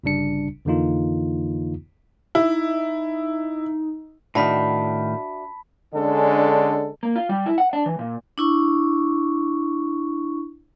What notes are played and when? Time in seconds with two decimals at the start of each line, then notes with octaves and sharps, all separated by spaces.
0.04 G1 C#3 G3 D4 C#7
0.65 F2 D3 E3 A#3 D#4 F4
2.35 D#4 E4
4.35 A2 D#3 D4 F#4 E5 A5 B5 B6
5.94 D3 G#3 C#4 D4 A4
7.03 A#3
7.16 F4
7.29 G3
7.46 E4
7.58 F#5
7.73 D4
7.86 E3
7.99 A#2
8.38 D4 E4 C#6